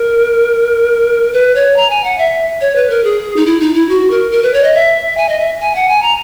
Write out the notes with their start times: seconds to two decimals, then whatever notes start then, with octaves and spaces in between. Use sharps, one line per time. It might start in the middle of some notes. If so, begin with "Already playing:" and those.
Already playing: A#4
1.33 B4
1.55 C#5
1.76 A#5
1.90 G#5
2.04 F#5
2.18 E5
2.61 C#5
2.75 B4
2.90 A#4
3.04 G#4
3.36 D#4
3.46 E4
3.60 D#4
3.75 E4
3.89 F#4
4.11 A#4
4.32 A#4
4.43 B4
4.54 C#5
4.64 D#5
4.74 E5
5.17 G#5
5.29 D#5
5.39 E5
5.61 G#5
5.75 F#5
5.88 G#5
6.02 A#5